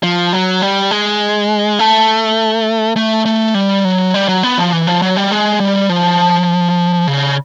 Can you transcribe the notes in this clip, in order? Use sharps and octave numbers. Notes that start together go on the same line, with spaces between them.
F3
F#3
G3
G#3
A3
A3
A3
G3
F#3
G3
F#3
B3
F3
E3
F3
F#3
G3
G#3
G3
F3
C#3